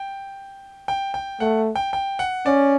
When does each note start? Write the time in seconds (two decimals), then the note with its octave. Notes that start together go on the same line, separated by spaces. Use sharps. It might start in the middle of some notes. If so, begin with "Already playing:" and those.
Already playing: G5
0.88 G5
1.14 G5
1.40 A3 F#5
1.76 G5
1.93 G5
2.19 F#5
2.46 C#4 D5